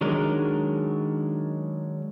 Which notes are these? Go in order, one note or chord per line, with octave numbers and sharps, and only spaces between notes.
D#3 F#3 G#3 D4 A#4